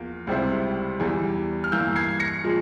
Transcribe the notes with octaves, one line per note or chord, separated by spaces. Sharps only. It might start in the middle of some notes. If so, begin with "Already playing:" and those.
Already playing: E2 F3 A#3
C#2 C3 G3 C4 E4
E2 E3 G3
F6
G2 E3 A#3 E6 G6
G#6 C7
A#6 C#7
A#2 F3 G#3